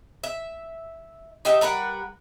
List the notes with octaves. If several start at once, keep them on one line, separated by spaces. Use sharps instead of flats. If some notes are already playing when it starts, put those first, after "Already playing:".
E5
D#4 G4 E5
G3 A#4 B4 F#5